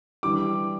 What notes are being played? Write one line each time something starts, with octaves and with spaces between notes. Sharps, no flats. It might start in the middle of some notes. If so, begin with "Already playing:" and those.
E3 G3 D4 D6